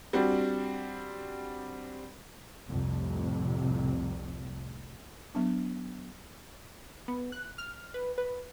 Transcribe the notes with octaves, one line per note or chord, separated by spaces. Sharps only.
G3 C4 D4 F#4
C2 F2 A2 C3
F#3 B3 D4
B3
F#6
F6
B4
B4